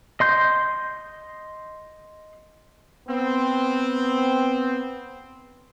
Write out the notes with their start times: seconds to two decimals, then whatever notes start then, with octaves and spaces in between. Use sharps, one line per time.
0.20 D#5 C6 G6
3.08 B3 C4